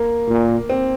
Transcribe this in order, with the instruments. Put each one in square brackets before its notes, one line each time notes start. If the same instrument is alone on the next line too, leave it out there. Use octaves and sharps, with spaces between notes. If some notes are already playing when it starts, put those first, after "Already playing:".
Already playing: [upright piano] A#3
[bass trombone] A#2
[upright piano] C4